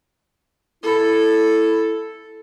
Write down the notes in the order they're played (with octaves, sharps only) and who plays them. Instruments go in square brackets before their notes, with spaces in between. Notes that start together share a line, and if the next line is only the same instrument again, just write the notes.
[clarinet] E4 [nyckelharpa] A4